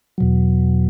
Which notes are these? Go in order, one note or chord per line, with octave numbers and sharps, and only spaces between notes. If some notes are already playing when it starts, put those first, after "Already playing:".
E2 B2 F#3